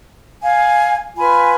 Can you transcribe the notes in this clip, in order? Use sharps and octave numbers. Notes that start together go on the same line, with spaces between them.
F5 G#5
F4 B4 G#5 B5